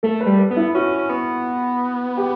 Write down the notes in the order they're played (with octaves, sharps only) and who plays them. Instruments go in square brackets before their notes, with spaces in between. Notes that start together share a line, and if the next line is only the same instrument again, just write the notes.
[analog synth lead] A3 [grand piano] A4
[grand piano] B4
[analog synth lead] G3
[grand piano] B4
[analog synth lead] B3
[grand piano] E4
[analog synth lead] C#4 [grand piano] F#4
[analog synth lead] C#4
B3
[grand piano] G4